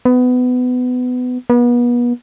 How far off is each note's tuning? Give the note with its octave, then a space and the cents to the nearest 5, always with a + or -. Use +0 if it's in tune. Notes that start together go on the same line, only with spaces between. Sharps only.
B3 +20
B3 -35